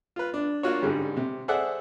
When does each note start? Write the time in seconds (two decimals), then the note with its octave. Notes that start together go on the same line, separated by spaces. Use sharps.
0.16 F4 B4
0.34 D4
0.63 A#3 D4 F4 F#4 C#5
0.82 G#2 D3 G3 C#4
1.17 C3
1.48 G#4 A4 C5 D5 E5 F#5